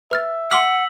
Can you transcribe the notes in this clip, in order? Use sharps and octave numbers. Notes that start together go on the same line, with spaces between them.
B4 E5 F6 A6
F#5 C6 D6 E6 F6 B6 F#7